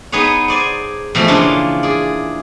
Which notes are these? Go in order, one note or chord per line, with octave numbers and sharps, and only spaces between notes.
B3 D#4 G#4 B4 C#5
C5 D5 G#5
B2 E3 F3 A3
C#3 E3 A#3 D4 F4
G#4 D5